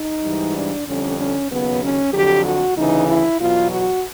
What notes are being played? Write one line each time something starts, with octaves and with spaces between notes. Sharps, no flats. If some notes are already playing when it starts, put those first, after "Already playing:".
Already playing: D#4
G#2 E3 G3
D4
F2 D3 G3 C#4
C#4
D#2 C#3 F#3 B3
C#4
F2 D3 F#3 G4
F#4
D2 C#3 E3 D#4
E4
E2 B2 F#3 F4
F#4